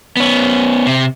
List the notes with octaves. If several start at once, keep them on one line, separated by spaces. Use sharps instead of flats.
B3 C#4
C3